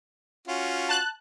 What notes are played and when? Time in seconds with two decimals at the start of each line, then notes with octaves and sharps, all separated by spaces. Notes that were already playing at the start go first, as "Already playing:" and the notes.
0.48 C#4 F4 F#4
0.89 A5 F#6